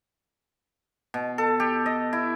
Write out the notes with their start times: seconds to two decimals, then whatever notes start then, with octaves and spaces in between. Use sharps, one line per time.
1.14 B2
1.38 A4
1.60 G4
1.86 D#5
2.13 E4